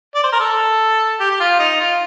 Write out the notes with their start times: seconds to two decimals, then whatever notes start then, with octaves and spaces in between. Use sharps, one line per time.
0.15 D5
0.24 C5
0.32 A#4
0.40 A4
1.20 G4
1.31 G4
1.40 F4
1.59 D#4
1.80 F4